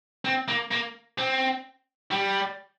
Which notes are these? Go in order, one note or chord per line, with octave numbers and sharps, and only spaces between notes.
C4
A#3
A#3
C4
G3